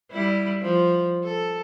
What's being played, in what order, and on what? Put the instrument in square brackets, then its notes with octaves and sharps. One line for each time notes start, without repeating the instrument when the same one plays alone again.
[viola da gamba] G3 E4
F3
A4